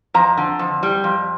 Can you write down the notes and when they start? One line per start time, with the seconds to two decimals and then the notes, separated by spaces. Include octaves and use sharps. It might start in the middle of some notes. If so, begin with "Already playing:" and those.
0.14 F2 A#5
0.37 D3
0.59 F2
0.83 G3
1.04 F2